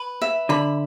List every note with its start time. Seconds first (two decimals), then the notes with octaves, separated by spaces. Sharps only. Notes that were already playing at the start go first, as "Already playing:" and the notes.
Already playing: B4
0.22 E5
0.49 D3 B5